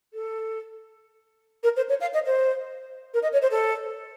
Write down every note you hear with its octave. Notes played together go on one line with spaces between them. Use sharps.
A4
A#4
C5
C#5
F5
D#5
C5
A#4
D#5
C#5
C5
A4